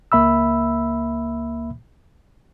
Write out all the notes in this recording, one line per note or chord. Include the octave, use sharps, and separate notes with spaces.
C#2 A#3 E5 B5 E6